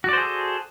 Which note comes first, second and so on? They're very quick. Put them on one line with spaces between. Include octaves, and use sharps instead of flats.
F#4 D5 C5 G#4 A4